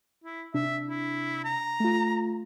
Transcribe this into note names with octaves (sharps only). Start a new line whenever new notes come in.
E4
C3 D4 E5
E4
A#5
A3 F4